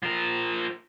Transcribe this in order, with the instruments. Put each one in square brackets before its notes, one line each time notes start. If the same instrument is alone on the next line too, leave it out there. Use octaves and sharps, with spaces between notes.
[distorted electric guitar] F3 A#4